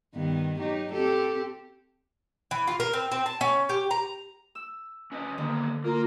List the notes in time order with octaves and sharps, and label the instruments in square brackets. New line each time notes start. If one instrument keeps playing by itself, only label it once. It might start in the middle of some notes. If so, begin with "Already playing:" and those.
[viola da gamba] G2 D#3 B3
F#3 D#4 G4
C4 G4 A4
[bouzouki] E3
F4
A#4
C4
C4
A5
C#4
G4
A#5
[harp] E6
[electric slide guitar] C#4 B4 D#5
[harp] D3 [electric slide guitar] D#3 A#3 B3
[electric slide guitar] A#3 [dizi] F4 [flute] A#4